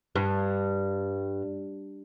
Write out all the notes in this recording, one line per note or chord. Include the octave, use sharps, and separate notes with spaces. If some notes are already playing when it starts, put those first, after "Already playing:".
G2